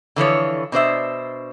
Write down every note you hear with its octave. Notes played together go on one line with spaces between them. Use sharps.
D3 E3 F3 C#5
B2 D4 C5 E5